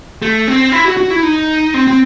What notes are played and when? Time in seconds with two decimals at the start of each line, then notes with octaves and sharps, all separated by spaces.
0.22 A3
0.48 C4
0.72 E4
0.85 F#4
0.97 F#4
1.10 E4
1.23 D#4
1.74 C4
1.88 C4